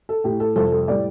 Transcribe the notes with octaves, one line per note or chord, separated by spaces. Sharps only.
A4
A2 A3 G4
A4
F2 C3 G3 A4
A4
A2 G3 D5